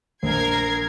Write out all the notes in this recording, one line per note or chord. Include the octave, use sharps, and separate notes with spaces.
A#1 A#4 G#6 C7